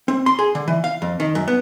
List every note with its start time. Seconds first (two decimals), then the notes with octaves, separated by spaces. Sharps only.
0.08 C4
0.26 C6
0.39 G#4
0.55 D3
0.68 E3
0.84 F5
1.02 F2
1.20 D#3
1.35 F#2
1.48 B3